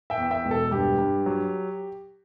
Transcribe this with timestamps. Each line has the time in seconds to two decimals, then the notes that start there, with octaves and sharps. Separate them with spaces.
0.10 E5 G5
0.17 E2
0.31 E5 G5
0.45 E1
0.51 A4
0.71 G2 G4
0.99 G2
1.26 F#3